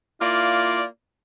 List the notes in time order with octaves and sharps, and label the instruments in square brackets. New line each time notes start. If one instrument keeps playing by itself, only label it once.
[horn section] A#3 E4 F4 D5